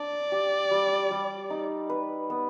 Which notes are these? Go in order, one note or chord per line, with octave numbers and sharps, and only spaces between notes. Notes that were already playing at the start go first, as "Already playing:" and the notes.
Already playing: D4 D5
G4
G3
G3
D#4
B4
B3